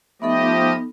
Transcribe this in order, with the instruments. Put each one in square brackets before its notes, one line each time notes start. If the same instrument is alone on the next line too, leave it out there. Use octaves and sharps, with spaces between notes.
[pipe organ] F3 G4 D#5 [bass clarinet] A3 [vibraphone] B3 D#4 A4